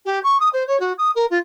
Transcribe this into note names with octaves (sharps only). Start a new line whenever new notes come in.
G4
C#6
D#6
C5
C#5
F#4
D#6
A#4
F4